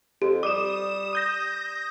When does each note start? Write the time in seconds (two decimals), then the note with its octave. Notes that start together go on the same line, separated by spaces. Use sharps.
0.22 F2 G4
0.43 G3 D6 D#6 E7
1.13 D#6 G6 A#6